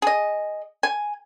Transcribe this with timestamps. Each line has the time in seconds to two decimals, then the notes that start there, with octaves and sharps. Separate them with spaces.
0.02 G#4 D#5
0.83 G#5